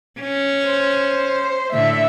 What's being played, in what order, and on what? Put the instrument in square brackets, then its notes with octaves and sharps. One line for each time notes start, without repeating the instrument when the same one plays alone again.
[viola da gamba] C#4
[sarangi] C5
[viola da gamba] A2 D3 [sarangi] E5